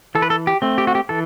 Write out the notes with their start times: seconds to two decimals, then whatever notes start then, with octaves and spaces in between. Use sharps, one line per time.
0.15 E3 A4
0.22 B4
0.30 A4
0.47 G4
0.62 A3 C4
0.78 G4
0.87 F#4
0.95 G4
1.09 E3 A4